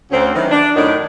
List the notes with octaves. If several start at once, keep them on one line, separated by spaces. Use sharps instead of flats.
D2 C4 C#4
D#3 E3 F#3
D4
F#2 A2 D#3 F#3 D4 D#4